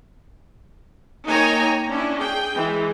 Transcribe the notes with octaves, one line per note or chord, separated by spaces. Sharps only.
A#3 D#4 C#5 G5 G#5 A#5
C#4 D4 E4
G#4 G5
E3 G#3